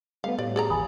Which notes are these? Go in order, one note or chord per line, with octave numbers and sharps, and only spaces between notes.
G3 A3 B3 F5
A2 G4 C#5 D5
G4 G#4 D5 A#5
G#1 E2 G#5 B5 D#6